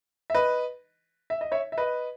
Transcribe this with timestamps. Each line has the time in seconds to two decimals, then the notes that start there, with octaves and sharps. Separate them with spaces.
0.30 E5
0.34 B4 D#5
1.30 E5
1.41 D#5
1.52 C#5 E5
1.72 E5
1.78 B4 D#5